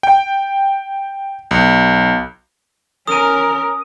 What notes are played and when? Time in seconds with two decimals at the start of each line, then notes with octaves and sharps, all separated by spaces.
0.03 G5
1.51 B1
3.07 C#4 A#4 D#6 D#7